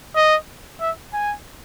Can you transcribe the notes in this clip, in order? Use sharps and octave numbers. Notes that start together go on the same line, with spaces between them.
D#5
E5
G#5